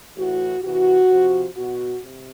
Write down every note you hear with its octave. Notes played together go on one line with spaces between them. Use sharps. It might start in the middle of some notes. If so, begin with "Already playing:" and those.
A2 E3 F#4
C3 E3 F#4
C3 F3
B2 F#4
C3